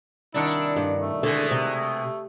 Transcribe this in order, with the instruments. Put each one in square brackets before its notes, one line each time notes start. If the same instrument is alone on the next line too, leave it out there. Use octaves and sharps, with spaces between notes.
[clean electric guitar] C2 D#3 F#5 [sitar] D4 [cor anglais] E4
[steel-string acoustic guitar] G2
[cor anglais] A3
[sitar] B2 G#3 [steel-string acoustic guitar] D3
[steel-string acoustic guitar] C3